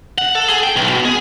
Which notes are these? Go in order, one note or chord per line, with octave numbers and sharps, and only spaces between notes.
F#5
A4
G#4
G5
B1
B2
G#4